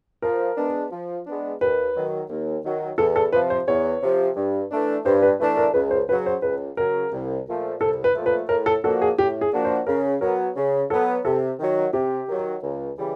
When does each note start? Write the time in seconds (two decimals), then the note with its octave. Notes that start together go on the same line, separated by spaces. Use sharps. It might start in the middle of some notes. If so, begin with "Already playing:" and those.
0.22 F3 A#4
0.57 G#3 B3 D4
0.91 F3
1.26 G#3 B3 D4
1.61 D#2 B4
1.95 D#3 F#3
2.30 D#2
2.64 D#3 F#3
2.98 E2 A4
3.16 A4
3.32 C3 F3 B4
3.50 C5
3.68 E2 C#5
4.02 C3 F3
4.36 G2
4.71 E3 A3 D4
5.05 G2 C5
5.22 B4
5.40 E3 A3 D4 B4
5.57 A#4
5.74 C#2 B4
5.91 C5
6.09 C#3 B4
6.12 F#3
6.26 C5
6.42 C#2 B4
6.77 C#3 F#3 A#4
7.12 C2
7.46 A#2 F3 A3
7.80 C2 A4
8.04 B4
8.15 A#2 F3 A3
8.26 B4
8.49 A2 A#4
8.66 A4
8.84 F3 A#3 D4 F#4 A4
9.02 G#4
9.18 A2 G4
9.41 G#4
9.53 F3 A#3 D4 F#4
9.65 C5
9.87 C#3 A#4
10.21 F#3 B3 A#4
10.56 C#3
10.90 F#3 B3 A4
11.25 C3 A4
11.59 D#3 F#3
11.93 C3 G4
12.28 D#3 F#3
12.63 C#2
12.97 C#3 E3 G3